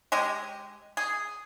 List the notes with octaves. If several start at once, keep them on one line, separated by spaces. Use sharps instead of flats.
G#3 G4 D#5
G#4